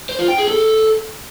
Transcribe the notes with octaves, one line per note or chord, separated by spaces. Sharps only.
C5
F4
G5
G#4
A4